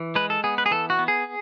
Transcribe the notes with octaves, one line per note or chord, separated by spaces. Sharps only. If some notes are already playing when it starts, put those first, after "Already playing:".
Already playing: E3
G#3 B4
A4
B3 G#4
B4
G#4
E3 A4
F#4
B3
G#4